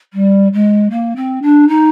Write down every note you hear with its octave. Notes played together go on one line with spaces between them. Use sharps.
G3
G#3
A#3
C4
D4
D#4